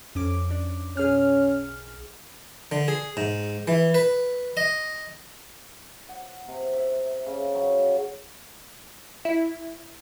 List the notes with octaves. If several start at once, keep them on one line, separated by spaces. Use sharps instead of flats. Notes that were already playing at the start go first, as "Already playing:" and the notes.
F2 C#4 D6
D4
B1 C#4 G#4 F6
D3
G#4
G#2
E3
B4
D#5
F#5
C3
E5
C#3
F#3
E4